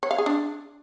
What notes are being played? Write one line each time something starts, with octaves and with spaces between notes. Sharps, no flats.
C#5
F5
G#4
D4